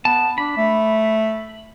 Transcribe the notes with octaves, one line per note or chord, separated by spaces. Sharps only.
B3 A5
D4 B5
A3